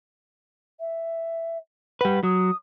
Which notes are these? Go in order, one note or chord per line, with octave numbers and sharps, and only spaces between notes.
E5
G3 B4 F#5
F#3 D#6